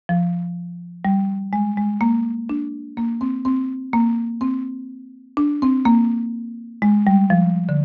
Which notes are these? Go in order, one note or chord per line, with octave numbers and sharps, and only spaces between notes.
F3
G3
G#3
G#3
A#3
D4
A#3
C4
C4
A#3
C4
D4
C4
A#3
G#3
G3
F3
D3